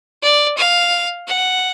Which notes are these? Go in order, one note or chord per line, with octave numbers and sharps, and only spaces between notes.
D5
F5
F#5